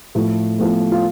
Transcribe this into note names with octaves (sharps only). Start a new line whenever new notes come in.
A2 F3 A3
A2 F3 A3
F4